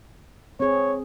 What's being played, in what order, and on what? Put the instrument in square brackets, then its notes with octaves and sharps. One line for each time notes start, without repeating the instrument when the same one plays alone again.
[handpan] C4 G#4 [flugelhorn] C#5